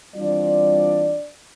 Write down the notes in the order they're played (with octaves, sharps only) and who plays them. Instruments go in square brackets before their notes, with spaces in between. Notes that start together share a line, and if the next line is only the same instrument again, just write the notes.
[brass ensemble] E3 G3 C4 D4 F4 D5